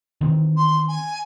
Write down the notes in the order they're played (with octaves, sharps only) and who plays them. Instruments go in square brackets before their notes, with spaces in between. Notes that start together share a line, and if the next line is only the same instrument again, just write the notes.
[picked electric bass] D#3 E3 C4
[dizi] C6
G#5